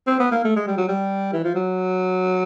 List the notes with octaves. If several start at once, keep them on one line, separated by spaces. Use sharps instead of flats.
C4
B3
A#3
A3
G#3
G3
F#3
G3
E3
F3
F#3